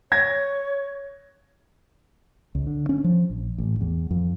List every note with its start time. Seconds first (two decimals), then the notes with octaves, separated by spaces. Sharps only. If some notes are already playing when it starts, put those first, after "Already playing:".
0.12 C#5 G#6 A#6
2.55 C#2
2.67 D3
2.89 C#4
3.04 F3
3.30 A#1
3.58 A1
3.81 E2
4.11 F2